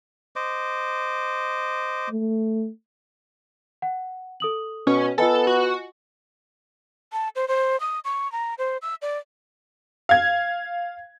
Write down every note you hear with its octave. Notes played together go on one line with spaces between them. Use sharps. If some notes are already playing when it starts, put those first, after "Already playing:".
C5 D#5 D6
A3
F#5
A4 D#6 F#7
B2 C#4
B3 F4 A4 D#5 G#5
F#4
A5
C5
C5
D#6
C#6
A#5
C5
E6
D5
F5 G#6